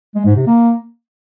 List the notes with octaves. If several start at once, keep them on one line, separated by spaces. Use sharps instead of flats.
G#3
G#2
C3
A#3